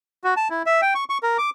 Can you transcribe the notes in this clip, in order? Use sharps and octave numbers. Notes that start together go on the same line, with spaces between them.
F#4
A5
E4
E5
G5
C#6
C#6
A#4
D6